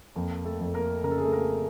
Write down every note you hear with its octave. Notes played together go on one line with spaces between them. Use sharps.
F2 A#3 A#4
A3 A4
F2
A#3 A#4
C#3 A#4
A4
G#4
A3 A4
A#3 A#4